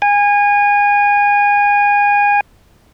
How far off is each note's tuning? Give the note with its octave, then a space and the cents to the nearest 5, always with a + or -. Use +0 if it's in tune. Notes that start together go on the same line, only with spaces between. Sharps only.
G#5 -25